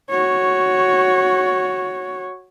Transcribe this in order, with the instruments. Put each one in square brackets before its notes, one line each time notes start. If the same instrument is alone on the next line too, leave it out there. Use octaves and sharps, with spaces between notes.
[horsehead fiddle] F#4 C#5